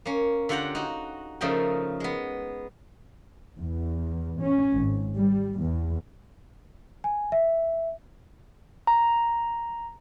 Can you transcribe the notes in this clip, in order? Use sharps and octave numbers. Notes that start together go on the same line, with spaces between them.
A#3 C#4
D3 F4 G4 F#5 G5 A#5
D#4 F#4
C#3 F3 A3 D#4 A#4 G5
G#3 B3
E2
C#4
G#1
G3
E2
G#5
E5
A#5